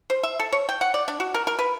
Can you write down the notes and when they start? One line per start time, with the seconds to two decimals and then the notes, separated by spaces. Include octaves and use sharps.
0.10 C5
0.23 E5
0.40 A4
0.52 C#5
0.69 G5
0.81 F#5
0.94 D5
1.08 D4
1.20 F#4
1.34 A#4
1.47 A#4
1.59 B4